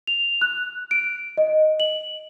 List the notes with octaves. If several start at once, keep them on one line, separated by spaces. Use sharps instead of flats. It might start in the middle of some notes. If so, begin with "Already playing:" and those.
F7
F#6
D7
D#5
F#7